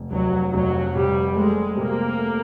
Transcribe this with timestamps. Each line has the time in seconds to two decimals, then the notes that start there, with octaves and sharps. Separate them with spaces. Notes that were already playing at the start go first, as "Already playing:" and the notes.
Already playing: F1
0.11 F1 F#3
0.53 F1 F#3
0.95 C3 G3
1.36 G#3 A3
1.77 C3 A#3
2.19 A3